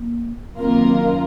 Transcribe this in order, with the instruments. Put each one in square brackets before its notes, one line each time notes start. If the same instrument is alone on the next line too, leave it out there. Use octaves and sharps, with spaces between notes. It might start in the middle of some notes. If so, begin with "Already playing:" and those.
Already playing: [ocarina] A#3
[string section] F#2 D#3 A#3 F4 A#4 [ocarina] C4
[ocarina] C#4